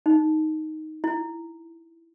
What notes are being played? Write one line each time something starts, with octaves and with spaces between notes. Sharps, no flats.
D#4
E4